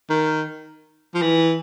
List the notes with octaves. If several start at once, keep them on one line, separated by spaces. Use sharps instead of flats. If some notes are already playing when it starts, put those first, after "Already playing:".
D#3
F3
E3